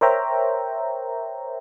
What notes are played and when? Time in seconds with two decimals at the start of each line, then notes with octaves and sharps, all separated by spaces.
0.01 A#4 C5 C#5 E5 G5 A#5